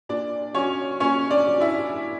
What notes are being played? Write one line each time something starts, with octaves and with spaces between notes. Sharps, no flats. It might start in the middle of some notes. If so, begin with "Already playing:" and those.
A#2 D4 D5
F#3 C#4 C#5
A#2 C#4 C#5
D4 D5
F#3
E4 E5